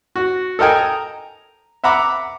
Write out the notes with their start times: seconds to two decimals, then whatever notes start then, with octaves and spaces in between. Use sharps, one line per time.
0.16 F#4
0.59 A4 A#4 D#5 G5 G#5
0.77 A#5
1.84 E5 F#5 A#5 B5 D6